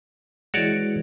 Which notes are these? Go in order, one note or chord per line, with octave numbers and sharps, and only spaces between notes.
E3 G#3 F#4 C#5 D5